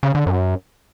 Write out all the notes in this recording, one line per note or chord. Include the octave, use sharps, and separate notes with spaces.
C#3
D3
F#2